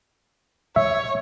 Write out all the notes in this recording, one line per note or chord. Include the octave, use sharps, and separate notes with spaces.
C#5 E5